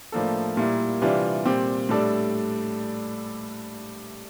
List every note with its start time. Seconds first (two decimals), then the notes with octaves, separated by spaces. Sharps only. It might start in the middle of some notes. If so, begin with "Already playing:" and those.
0.12 A2 F3 A#3 D4 A4
0.57 A#2 G3 A#3 E4
1.02 C3 E3 G3 D4 F4
1.45 A#2 G3 C4 G4
1.89 A2 G3 D4 A4